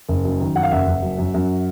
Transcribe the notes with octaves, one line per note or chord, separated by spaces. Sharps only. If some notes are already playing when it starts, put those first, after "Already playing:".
F#1
F#2
D#3
F#2 F#5
F5
F#1 E5 F#5
F#1
F#2
F#2
F#2